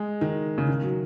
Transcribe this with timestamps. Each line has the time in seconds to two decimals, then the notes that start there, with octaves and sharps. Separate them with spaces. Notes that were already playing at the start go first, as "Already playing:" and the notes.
Already playing: G#3
0.21 D#3
0.58 C#3
0.68 D#3
0.83 F#3